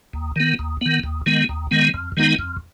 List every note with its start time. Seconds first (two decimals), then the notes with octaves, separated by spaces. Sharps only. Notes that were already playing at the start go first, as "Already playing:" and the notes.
0.13 D#2
0.36 D#3 B3
0.59 D#2
0.81 D#3 B3
1.03 D#2
1.26 D#3 G#3 B3
1.49 D#2
1.71 D#3 G#3 B3
1.94 F2
2.17 D#3 G#3 B3 D#4
2.39 F2